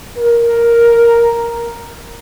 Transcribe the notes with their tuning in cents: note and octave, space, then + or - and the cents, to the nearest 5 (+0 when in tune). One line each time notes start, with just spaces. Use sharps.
A#4 +5